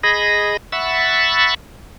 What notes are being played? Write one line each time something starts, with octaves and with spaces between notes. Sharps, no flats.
G#4 D#5 B5 A#6
E5 F#5 B5 C#6 E6 A6